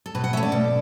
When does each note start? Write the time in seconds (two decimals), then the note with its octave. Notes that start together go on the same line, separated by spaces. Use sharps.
0.06 A4
0.15 B2 B4
0.24 F#5
0.33 A3 C#4 E5
0.43 D5
0.52 B2